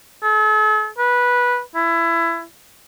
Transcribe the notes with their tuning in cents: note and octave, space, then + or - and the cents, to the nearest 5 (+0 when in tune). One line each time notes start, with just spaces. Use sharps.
A4 -45
B4 -15
E4 +25